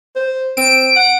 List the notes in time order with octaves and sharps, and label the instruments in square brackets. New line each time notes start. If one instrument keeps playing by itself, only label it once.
[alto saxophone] C5
[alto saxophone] C4 [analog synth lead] D7
[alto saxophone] F#5